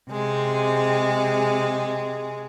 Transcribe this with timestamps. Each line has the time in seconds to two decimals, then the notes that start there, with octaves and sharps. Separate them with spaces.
0.10 C3 G#3 G#4